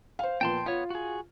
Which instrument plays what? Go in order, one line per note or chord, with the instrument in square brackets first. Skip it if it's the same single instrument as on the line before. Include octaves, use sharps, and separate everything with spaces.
[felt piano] C5 F5
[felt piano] A#2 F3 B3 [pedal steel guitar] G5 A5 C6
[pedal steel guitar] B3 C#5 [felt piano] F4
[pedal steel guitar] F#4 G#4